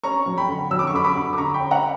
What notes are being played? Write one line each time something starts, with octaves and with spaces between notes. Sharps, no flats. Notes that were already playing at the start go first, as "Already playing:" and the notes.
C#4 A#5 C#6
F#3
G5 B5
D3
F#3 E6
D6
C#6
D3 B5 D6
B5 D6
D3
D6
D3 A#5 C#6
G5 B5
C#4
F#5 A#5